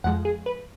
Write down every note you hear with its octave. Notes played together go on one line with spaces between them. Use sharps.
F2 F3 G#3 F#5
G#4
B4